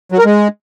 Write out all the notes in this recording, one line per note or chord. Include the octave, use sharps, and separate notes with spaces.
F#3
A#4
G#3